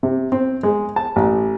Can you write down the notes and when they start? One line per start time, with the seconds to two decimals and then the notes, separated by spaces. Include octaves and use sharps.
0.03 C3
0.32 C4
0.63 G#3
0.96 A5
1.16 A1